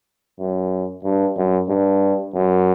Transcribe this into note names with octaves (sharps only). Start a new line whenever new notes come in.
F#2
G2
F#2
G2
F#2